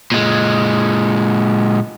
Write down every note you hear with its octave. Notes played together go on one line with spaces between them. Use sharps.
A#2 G#3